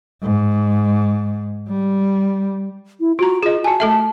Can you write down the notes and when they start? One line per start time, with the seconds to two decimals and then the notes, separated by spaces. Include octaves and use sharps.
0.22 G#2
1.68 G3
3.00 E4
3.19 F4 F#4 A#5
3.43 F4 G#4 D#5
3.64 F#4 G#5 A5
3.80 A3 A4 E5